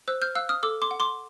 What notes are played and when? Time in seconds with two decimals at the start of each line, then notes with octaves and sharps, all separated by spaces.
0.08 C5 E6 F#6
0.22 F6 G6
0.35 F5 E6 F#6
0.49 D#6 F6
0.63 A4 D6 E6
0.82 C6 D6
0.91 F#5
1.00 C6 D6